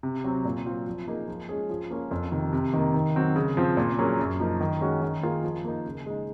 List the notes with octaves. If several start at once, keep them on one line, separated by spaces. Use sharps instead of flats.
C3
F#3 C4
A#2
F#3 C4 F4
F3
A#3 D#4 G#4
F3
G#3 C#4 G#4
F3
A#3 C#4 F4
F2
C3 D#3
C3
D#3 A#3
D#3
F#3 C4 F#4
C#3
F3 C4 F4
A#2
F#3 A#3 C#4 G#4
F#2
F3 A#3 D#4
D#3
G#3 C#4 F#4
D#3
A#3 F4 G#4
F3
A#3 D#4
C#3
G#3 D#4